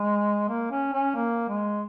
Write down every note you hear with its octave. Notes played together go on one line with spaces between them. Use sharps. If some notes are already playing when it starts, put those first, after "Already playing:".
Already playing: G#3
A#3
C#4
C#4
A#3
G#3